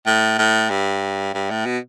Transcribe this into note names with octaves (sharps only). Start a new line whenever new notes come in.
A2
A2
G2
G2
A2
B2